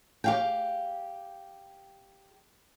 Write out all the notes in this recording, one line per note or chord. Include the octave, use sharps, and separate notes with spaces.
G4 F5 G5